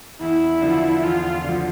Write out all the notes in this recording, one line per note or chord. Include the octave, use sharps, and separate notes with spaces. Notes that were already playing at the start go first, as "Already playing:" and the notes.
E2 E4
D3 F3
E2 F4
D3 F3